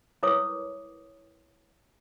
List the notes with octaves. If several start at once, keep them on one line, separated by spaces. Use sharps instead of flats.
E4 A#4 B4 C#5 D6 D#6